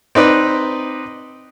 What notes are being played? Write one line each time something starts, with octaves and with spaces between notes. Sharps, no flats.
C4 D#4 B4 D5